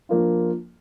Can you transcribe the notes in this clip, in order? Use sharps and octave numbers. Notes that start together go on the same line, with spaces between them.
F3 A#3 D4 F4